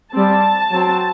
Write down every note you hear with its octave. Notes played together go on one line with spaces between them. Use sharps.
G3 C4 A5
F#3 C4